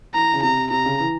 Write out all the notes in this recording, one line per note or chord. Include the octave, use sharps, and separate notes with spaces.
E3 A#5
C#3
C3 A#5
C3 A#5
C#3
E3